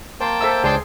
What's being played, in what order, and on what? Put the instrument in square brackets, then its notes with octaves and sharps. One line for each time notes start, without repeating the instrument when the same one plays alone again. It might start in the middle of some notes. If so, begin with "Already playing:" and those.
[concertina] A#3 G5 A5 [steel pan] C5
[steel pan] A4 E5 E6 [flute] C5
[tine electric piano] C#2 [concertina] D4 G5 A5 [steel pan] G#4 C6